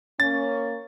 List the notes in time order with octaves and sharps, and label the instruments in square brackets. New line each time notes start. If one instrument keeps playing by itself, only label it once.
[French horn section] A#3 C#4 [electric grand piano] A6